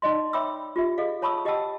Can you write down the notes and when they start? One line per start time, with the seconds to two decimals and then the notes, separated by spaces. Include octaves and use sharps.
0.02 D#4 D5 D#5 C6
0.33 C#5 E5 G5 B5 D6 E6
0.76 F4 G4 E5
0.98 G#4 D#5 F5
1.22 C#5 A5 B5 C#6 D#6 E6
1.45 G4 D#5 F#5 G5 A5 E6